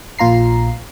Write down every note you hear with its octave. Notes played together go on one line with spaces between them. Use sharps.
A#1 A#2 F4 A#5 C7